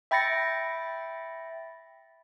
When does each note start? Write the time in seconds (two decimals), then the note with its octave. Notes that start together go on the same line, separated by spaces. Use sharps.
0.11 E5 G5 B5 A6 A#6 C#7